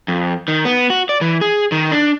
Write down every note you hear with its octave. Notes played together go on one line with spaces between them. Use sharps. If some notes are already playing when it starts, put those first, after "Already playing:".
F2
D#3
B3
F#4
D5
E3
G#4
D#3
D4